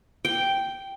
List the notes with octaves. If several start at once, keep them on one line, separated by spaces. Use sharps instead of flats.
G5